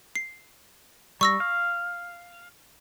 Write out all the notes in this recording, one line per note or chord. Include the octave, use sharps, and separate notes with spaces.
C7
G3 C#6 E6 A#6
F5